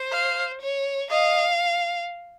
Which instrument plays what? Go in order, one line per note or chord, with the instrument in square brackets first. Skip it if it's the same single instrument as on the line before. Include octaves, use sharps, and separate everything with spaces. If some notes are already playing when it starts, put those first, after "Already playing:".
Already playing: [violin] C5
[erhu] F5
[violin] C#5
[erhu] D#5 [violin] F5